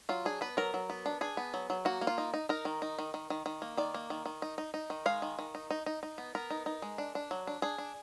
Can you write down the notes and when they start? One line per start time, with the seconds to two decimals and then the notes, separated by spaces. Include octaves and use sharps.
0.09 F#3 F4
0.25 D4 G#4
0.41 B3 B4
0.57 F#3 A#4
0.74 F#3
0.90 B3
1.06 D4
1.21 D4 G#4
1.37 B3
1.54 F#3
1.70 F#3
1.85 A#3 F#4
2.01 A#3
2.07 F4
2.18 D#4
2.34 D#4
2.49 D#4 A#4
2.65 D#3
2.82 D#4
2.98 D#3
3.14 D#3
3.30 D#3
3.46 D#3
3.62 A#3
3.77 D#3 D5
3.94 A#3
4.10 D#3
4.26 D#3
4.42 D#4
4.58 D#4
4.74 D#4
4.90 D#3
5.06 G#3 F5
5.22 D#3
5.39 D#3
5.55 D#4
5.71 D#4
5.86 D#4
6.03 D#4
6.18 B3
6.35 B3 A#4
6.50 D#4
6.66 D#4
6.82 G#3
6.98 D4
7.15 D4
7.31 F#3
7.47 D4
7.62 D4 G#4
7.78 D4